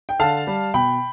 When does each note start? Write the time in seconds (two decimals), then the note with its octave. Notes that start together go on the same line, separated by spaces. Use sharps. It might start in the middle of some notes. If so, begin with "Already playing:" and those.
0.09 G5
0.19 D3 F5 A5
0.47 G3
0.74 B2 G5 B5